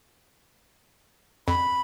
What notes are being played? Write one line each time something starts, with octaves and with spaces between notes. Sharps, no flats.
F2 B5